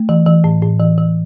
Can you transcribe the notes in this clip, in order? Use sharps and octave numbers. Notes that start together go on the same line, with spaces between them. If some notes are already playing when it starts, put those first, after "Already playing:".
Already playing: A3
E3
E3
A2
A2
E3
E3